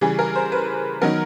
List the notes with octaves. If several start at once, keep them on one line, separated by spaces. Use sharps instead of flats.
C#3 E3 G3 G#4
A#4
C5
B4
D#3 F#3 B3 A#4